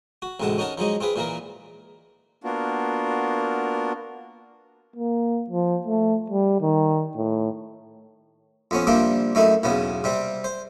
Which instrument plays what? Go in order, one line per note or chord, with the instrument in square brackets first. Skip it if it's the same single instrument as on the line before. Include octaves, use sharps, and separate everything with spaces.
[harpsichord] F#4
A1 D2 C3 G#3 F#5 A5
C#4 D#4 A#4 F#5 A5
F3 F#3 G#3 D#4
C4 F4 G#4 B4
A#2 E3 A#3 A#4
[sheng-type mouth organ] A#3 B3 D4 F4 F#4 A#4
[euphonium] A#3
F3
A3
G3
D#3
A2
[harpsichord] F2 B3 C#4
C3 F3 G3 A#3 C4 D4
F#2 A3 D#4 E4
B1 E2 C#3 B3
C3 G3 C4
C5